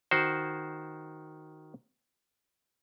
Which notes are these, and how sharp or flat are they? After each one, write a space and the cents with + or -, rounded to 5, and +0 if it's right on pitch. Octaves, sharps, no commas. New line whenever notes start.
D#3 +0 F#4 +10 C5 +0